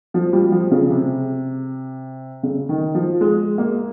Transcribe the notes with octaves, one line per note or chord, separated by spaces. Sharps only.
F3
G3
F3
C#3
C3
C#3
D#3
F3
G#3
A#3